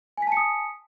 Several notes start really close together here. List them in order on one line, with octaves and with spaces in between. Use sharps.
G#5 B6 A5 C#7 D#6